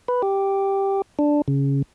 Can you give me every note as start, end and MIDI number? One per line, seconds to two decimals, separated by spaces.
0.08 0.22 71
0.22 1.02 67
1.19 1.42 62
1.48 1.82 49